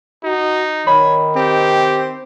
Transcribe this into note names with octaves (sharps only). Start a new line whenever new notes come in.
D#4 F#4
D#3 C#5 B5
C4 G4